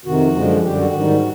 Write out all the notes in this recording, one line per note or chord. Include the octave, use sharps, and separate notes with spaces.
F2 C3 D#3 F#4
F#2 D3 F3 G#3
F#2 D3 G3 G4
F#4
G#2 D#3 G3